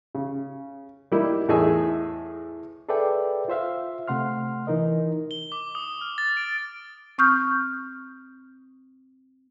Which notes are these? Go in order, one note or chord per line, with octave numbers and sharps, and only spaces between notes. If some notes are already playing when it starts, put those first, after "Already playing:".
C#3
G3 A#3 D#4 E4
E2 A2 G#4 D#5 E5 G#5
G#4 A4 B4 D5 E5 G5
F4 C5 E5 F5
C3 A3 F#5 C6 F6
E3 D#4 A#4 D#5
G7
D6
D#6
F6
A6
D7
C4 C#6 D#6 F6 G6